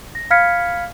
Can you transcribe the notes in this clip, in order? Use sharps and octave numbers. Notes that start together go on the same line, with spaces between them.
A#6
F5 B5 F6 G#6 B6 C#7